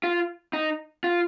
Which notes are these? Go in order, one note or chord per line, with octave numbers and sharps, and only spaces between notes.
F4
D#4
F4